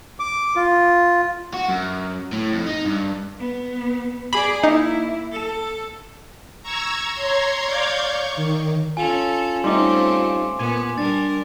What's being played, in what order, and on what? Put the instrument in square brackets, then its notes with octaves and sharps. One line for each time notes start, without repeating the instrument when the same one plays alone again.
[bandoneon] D6
F4
[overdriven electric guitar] F#4
F#2
A2
F2
D#4
G2
[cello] B3
[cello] G#4 D5 [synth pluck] B5
[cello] A#3 E4 [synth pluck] D#4
[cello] A4
[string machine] A#5 C#6 E6 G#6
C#5 A#5 C6 G#6
C#5 D5 F5 D6 G6 G#6
C#6
D#3
[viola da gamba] C#4 A4 [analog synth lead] F4 [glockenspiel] G#5 F7
[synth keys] G3 D#4 [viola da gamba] A3 C4 C#4 [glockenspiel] C6 D6
[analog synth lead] A#2 [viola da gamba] B3 [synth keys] G#5
[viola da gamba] G3 A#4 [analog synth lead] D4 [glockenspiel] A6